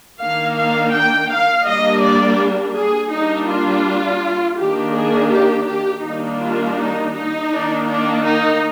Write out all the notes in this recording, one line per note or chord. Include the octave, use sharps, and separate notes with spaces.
D#3 A#3 D4 F5
F5
G5
F5
G3 A#3 D4 D#5
D5
G#4
G3 A#3 D4 D#4
F4
D#3 A#3 D4 G4
G#4
G4
G4
D#3 G3 A#3 D4 D#4
F4
D#4
D#4
D#3 A#3 D4
D4
D#4